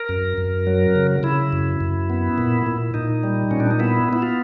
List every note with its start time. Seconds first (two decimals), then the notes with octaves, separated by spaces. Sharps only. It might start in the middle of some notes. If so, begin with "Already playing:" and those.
Already playing: A#4
0.09 F#2
0.37 F#2
0.67 F#3
0.96 C#3
1.23 C#3 E4
1.53 F#2
1.80 F#2
2.10 B3
2.38 A#2
2.66 A#2
2.94 A#2 D#4
3.23 G3
3.51 A#2 C#4
3.60 D4
3.71 D#4
3.79 B3 E4
4.08 B3 E4
4.22 F4